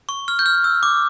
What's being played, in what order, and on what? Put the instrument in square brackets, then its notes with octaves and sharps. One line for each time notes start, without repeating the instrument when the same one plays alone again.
[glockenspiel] C#6
F6
G6
F6
E6
D6